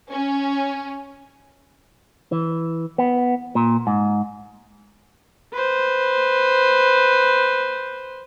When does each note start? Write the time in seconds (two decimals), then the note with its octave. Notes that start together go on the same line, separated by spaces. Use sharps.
0.12 C#4
2.32 E3
2.98 B3
3.55 A#2
3.87 G#2
5.53 B4 C5